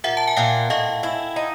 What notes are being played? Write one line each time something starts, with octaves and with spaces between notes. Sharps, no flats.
A#2 E5 F#5
A5
G#5
A#2 F5 G5
A2 D#5 F5
E4
D#4